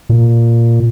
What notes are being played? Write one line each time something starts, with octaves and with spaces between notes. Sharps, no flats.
A#2